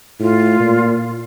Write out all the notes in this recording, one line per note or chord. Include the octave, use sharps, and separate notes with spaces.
A2 F4
A#2